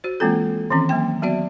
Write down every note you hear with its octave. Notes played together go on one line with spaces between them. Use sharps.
F#4 C5
E3 G#3 A#3 C4 F4 A4
D#3 E3 C4 C#4
F#3 A#3 G5
F#3 B3 F#4 D5 E5